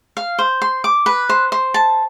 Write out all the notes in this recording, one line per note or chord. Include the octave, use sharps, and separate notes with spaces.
F5
C5
C6
D6
B4
C5
C5
A5